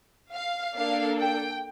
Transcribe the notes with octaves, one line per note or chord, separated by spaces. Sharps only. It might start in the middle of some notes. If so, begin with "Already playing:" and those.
F5
A#3 D4 A4 F5
G5